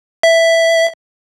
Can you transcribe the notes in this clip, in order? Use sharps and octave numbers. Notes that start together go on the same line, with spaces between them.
E5